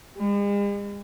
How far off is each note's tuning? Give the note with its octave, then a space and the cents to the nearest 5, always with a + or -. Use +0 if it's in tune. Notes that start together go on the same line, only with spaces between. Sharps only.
G#3 -45